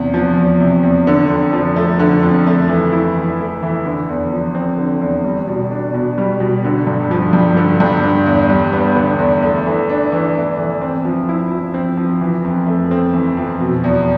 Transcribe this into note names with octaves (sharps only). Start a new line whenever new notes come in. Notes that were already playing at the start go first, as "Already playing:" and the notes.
Already playing: E2 C3
F3
E2
C3
E2
D3
F2
F3
A3
D3
F2
A3
E3
E4
E3
A3
E3
D3
E2
F3
C4
D3
E2
G3
B2
D4
B2
G3
B2
D3
G2
F3
G2
D3
G2
D3
E2
G3
B3
D3
E2
A3
E3
D4
E3
A3
E3
C4
F3
E4
F3
C4
F3
E3
F2
A3
C4
E3
F2
B2
E2